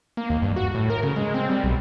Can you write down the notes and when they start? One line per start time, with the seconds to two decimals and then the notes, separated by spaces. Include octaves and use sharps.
0.17 A#3
0.30 D#2
0.42 G2
0.56 F#4
0.75 A2
0.90 A#4
1.03 C#3
1.16 G#3
1.34 C4
1.49 G3
1.64 B1